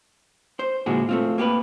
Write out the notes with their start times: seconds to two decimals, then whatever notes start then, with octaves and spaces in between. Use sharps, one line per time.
0.59 C5
0.86 A#2 D3 G#3 E4 F#4 G#4
1.09 A3 C4 F4
1.38 A#3 G4 A4 B4